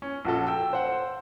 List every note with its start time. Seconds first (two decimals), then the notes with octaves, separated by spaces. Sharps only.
0.02 C#4
0.25 A#1 F#4 A4
0.47 G5 E6
0.73 C5 F#5